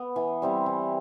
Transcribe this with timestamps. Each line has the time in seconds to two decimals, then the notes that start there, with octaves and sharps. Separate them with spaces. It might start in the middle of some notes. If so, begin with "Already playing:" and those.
Already playing: B3
0.16 E3
0.42 G3 C4 E4
0.66 E3